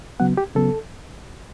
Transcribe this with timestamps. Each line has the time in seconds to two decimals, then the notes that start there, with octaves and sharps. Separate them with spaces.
0.20 C#3 F#3 B3 F#5
0.37 G4
0.55 C#3 F#3 B3 A4